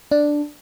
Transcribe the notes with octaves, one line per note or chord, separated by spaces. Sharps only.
D4